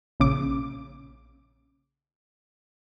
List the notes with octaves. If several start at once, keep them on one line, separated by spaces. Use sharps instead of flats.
A#1 C#3 D6